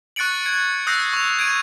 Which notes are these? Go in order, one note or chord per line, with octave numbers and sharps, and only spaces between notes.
C#6 F#6 A6 C#7 D7 F#7
G#6 C#7
D#6 E6 F#6 G6 A#6 C7
C#6 F7
G#6 D7 D#7